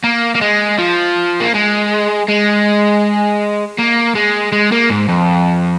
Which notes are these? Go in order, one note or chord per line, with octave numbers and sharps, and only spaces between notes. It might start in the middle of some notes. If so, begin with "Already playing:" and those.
A#3
A#3
G#3
F3
A#3
G#3
G#3
A#3
G#3
G#3
A#3
G#2
F2